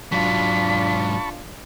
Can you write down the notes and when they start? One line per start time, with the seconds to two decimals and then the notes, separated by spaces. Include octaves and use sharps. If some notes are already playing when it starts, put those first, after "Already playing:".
0.12 G#2 F#3 D4 F4 A5 B5 C#6 B6